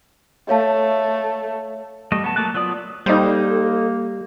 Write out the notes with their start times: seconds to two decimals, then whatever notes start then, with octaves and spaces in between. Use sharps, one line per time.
0.49 A3 C#5 F5 A5
2.12 G3 A3 D#5
2.24 B3 A5
2.36 F#3 A3 A#3 A5 F#6
2.54 F#3 B3 F4 D5 D#6
3.06 G3 A#3 D#4 A4 C5